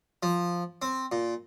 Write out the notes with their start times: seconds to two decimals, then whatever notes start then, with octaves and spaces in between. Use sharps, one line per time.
0.23 F3
0.82 C4
1.12 A#2